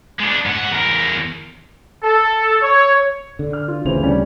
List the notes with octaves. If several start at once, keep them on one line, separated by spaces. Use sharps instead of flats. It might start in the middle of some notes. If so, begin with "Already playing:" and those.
G#3 D4
G#2 F#5
E2 A#4
A4
C#5
D3
F6
F4
D2 C#3 E3 C4 F7
G3 C#4 G4